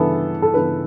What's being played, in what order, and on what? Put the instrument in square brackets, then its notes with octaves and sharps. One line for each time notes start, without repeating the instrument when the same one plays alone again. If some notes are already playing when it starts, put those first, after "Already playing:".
Already playing: [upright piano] G2 E3 B3 A4
A4
G2 E3 B3 B4